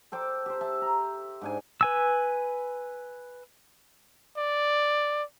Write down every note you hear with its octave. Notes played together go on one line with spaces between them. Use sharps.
A4 C5 G5 D6
G4 C5
E5 A5
A#5
G#2 D4 G#5
B4 G#5 E6
D5